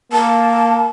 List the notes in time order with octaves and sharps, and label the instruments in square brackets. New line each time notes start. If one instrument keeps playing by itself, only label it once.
[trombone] A#3 [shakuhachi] A5